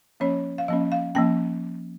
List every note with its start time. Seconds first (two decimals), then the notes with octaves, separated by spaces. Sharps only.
0.20 F3 A#3 C#4 C#5
0.58 F5
0.68 F3 A#3 C#4 D#5
0.92 F5
1.15 F3 A#3 C#4 G5